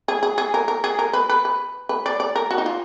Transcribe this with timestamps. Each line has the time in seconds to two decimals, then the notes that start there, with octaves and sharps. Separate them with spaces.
0.08 G#4
0.23 G#4
0.38 G#4
0.54 A#4
0.68 A#4
0.84 G#4
0.99 A#4
1.13 B4
1.29 B4
1.45 B4
1.89 B4
2.06 D5
2.20 D5
2.36 A#4
2.51 F#4
2.58 D#4
2.66 F4